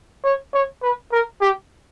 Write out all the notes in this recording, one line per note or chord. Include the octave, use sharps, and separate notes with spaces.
C#5
C#5
B4
A#4
G4